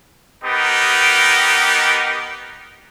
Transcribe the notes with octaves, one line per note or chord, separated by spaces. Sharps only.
B3 D#4 G4 A#4